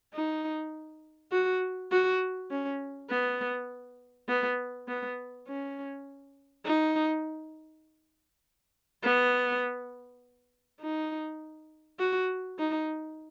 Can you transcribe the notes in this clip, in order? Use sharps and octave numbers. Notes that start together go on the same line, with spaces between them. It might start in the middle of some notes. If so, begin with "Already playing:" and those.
D#4
F#4
F#4
C#4
B3
B3
B3
C#4
D#4
B3
D#4
F#4
D#4